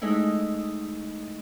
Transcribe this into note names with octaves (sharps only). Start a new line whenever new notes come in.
G#3 A3 D#4 E4